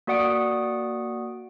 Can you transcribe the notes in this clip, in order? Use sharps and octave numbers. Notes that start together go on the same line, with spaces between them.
A#3 F#4 D5 F#5 D#6 D7